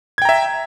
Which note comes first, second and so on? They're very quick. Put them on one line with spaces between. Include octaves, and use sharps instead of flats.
G#6 G5 A#5 E5